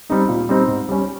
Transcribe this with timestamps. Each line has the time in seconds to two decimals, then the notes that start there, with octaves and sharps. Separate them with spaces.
0.10 G3 C4 D#4
0.29 A#2
0.49 G3 C4 D#4
0.68 G#2
0.89 G3 C#4